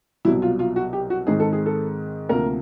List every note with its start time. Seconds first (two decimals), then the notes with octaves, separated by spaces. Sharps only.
0.25 C2 B2 F#3 E4
0.42 F4
0.59 F4
0.76 F#4
0.93 G4
1.10 F#4
1.27 G#2 D#3 G#3 C4 D#4 G#4
1.40 A4
1.53 G#4
1.66 A4
2.29 D2 C3 F3 A#3 A#4